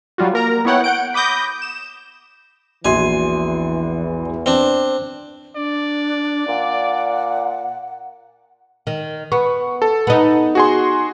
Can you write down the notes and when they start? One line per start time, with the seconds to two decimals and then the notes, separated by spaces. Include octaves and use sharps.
0.18 F#3 G3 F4 F#4
0.33 A#3 A#4 A#5
0.65 B3 E4 C#5 F#5 G5
0.84 F#5 G6 D7
1.14 B5 D6 D#6 G6 A#6
1.62 E7
2.85 A#1 E2 E3 F#4 G#5 C6
4.46 C4 D4
5.56 D4 D5
6.49 A#2 F#5
8.87 D#3
9.32 B3 C#6
9.82 A4
10.07 B3 D#4
10.55 F#4 G#4 C6